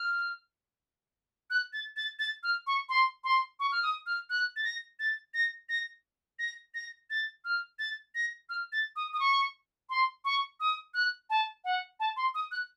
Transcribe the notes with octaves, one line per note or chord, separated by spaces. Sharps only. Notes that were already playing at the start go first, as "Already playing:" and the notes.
Already playing: F6
F#6
A6
A6
A6
F6
C#6
C6
C6
C#6
F6
D#6
F6
F#6
A6
A#6
A6
A#6
A#6
A#6
A#6
A6
F6
A6
A#6
F6
A6
D#6
D#6
C#6
C6
C#6
D#6
F#6
A5
F#5
A5
C6
D#6
F#6